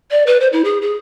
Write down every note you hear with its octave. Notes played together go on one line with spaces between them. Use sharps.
D5
B4
C5
E4
G#4
G#4